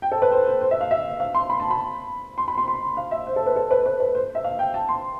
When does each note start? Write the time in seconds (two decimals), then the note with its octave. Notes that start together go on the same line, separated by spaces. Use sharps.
0.02 G5
0.12 A4
0.22 B4
0.32 C5
0.46 C5
0.61 C5
0.71 E5
0.81 F5
0.91 E5
1.20 F5
1.35 C6
1.50 B5
1.60 A5
1.71 B5
2.38 C6
2.48 B5
2.58 C6
2.68 C6
2.97 F5
3.11 E5
3.27 C5
3.36 A4
3.46 B4
3.56 A4
3.71 B4
3.86 B4
4.00 B4
4.15 C5
4.35 E5
4.44 F5
4.59 G5
4.74 A5
4.89 C6